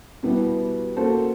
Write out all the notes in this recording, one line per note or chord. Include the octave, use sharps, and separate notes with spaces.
B2 G3 B3 E4 G4
A#3 C#4 F#4 A4 C5